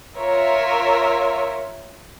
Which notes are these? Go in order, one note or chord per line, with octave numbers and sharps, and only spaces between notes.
F4 A#4 C#5 E5